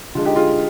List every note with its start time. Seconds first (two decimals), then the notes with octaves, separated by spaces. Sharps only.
0.15 D3 G#3 D4 F4
0.25 D#4 G4
0.36 F4 G#4